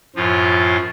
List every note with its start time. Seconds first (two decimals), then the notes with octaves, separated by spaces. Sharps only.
0.16 F#2 A2 F3 F4